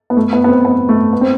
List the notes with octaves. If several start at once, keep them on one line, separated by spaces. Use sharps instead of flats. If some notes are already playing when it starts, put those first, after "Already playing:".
B3
A3
B3
B3
C4
B3
A3
B3
C4